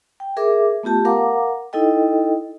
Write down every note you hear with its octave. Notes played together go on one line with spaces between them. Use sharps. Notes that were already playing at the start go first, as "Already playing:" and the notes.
G5
G#4 A#4 E5 D6
A3 B3 F4 G4 A5
A#4 F5 F#5 A#5 D6
D#4 E4 A4 D#5 G5